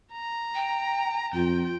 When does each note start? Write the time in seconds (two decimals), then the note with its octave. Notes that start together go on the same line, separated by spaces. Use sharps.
0.12 A#5
0.55 G5
1.34 F2 F4 G5